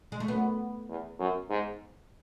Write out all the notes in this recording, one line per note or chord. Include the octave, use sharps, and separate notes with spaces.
G#3
A3
F#2 B3
E2
F#2
G#2